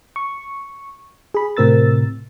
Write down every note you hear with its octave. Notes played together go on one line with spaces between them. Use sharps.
C#6
G#4 B5
A2 C3 C4 A#4 E6 A6